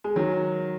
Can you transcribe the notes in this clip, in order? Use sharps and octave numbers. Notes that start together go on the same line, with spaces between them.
G#3
D#3 F#3